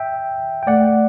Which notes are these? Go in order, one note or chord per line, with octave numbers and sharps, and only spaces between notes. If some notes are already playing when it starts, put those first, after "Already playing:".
Already playing: E5 G5
G5
A3 D5 F#5